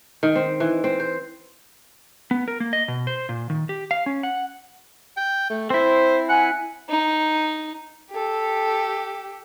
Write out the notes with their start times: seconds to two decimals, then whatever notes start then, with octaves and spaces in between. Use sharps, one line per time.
0.23 D#3
0.36 C4
0.60 E3
0.84 C4
1.00 C5
2.31 B3
2.48 A#4
2.60 A#3
2.73 D#5
2.88 B2
3.07 C5
3.29 A#2
3.50 D#3
3.69 G4
3.91 F5
4.06 C#4
4.23 F#5
5.17 G5
5.50 A3
5.70 C4 E4 C5
6.29 F#5 G#5
6.89 D#4
8.11 G4 A4